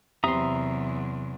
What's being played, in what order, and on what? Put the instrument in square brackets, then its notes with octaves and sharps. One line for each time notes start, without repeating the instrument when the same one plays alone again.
[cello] E2 F#3 [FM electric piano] C3 C4 C6 [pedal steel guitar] E5 A#5 D#6